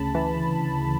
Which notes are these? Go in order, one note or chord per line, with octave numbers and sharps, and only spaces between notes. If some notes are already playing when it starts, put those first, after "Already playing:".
Already playing: D2 C#3 A5 B5
E3